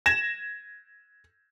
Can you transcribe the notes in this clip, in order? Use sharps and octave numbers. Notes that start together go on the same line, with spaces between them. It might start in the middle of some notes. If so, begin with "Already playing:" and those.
G#6 A#6 E7